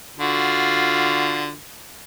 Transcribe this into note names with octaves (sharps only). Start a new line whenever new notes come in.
D3 F4 F#4